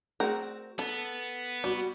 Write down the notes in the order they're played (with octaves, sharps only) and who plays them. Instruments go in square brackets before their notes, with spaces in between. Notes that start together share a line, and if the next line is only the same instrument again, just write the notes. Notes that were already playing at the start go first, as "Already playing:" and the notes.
[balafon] A3 G#4 D5 [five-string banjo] C4 F#4 A#4
[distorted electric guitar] B3 [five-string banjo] A4
[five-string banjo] G3 [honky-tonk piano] F#4